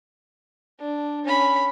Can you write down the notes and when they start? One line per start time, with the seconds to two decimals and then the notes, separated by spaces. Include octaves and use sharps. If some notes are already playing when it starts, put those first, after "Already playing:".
0.80 D4
1.25 C#4 B5